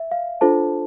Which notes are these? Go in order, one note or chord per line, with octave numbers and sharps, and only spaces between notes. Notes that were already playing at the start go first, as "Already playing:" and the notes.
Already playing: E5
F5
D4 F4 A4 C5 A5